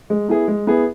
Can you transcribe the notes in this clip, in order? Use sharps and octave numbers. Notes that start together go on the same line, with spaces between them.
G#3
B3 E4 G#4
G#3
B3 E4 G#4